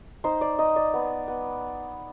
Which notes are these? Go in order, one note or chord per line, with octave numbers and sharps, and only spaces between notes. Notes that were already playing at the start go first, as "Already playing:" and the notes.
D#4 C5
D5
D#4 D#5
D5
B3
B3